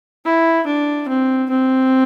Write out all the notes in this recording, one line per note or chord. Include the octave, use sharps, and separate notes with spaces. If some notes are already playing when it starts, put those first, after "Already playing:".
E4
D4
C4
C4